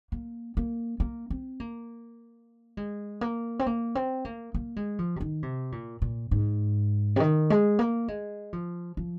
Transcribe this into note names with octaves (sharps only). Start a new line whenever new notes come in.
A#3
A#3
A#3
C4
A#3
G#3
A#3
C4
A#3
C4
A#3
A#3
G#3
F3
C3
D#3
C3
A#2
A#2
G#2
C3
D#3
G#3
A#3
G#3
F3
F3